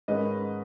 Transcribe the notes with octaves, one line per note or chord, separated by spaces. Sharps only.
G#2 D#3 G#3 C#4 B4 D#5